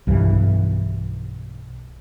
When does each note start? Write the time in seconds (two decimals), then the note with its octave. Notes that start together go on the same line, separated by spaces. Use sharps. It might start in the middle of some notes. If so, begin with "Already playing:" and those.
0.07 B1 G2 E3